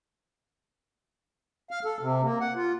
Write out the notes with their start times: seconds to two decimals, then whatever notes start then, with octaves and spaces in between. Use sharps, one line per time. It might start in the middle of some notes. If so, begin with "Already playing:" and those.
1.71 F5
1.85 A4
2.01 C3
2.22 A#3
2.40 F#5
2.55 F4